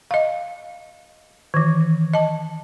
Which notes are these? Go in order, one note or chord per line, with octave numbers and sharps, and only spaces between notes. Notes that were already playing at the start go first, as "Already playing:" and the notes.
D#5 F5
D#3 E3
D#5 A5